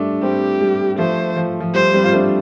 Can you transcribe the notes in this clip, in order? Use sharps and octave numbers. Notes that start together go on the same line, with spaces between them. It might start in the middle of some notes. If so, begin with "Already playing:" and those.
Already playing: G3 A3 D4
G3 C4 G4
G3
F3 A3 C5
F3
F3
G3 C5
G3 C4
F4
A3 D4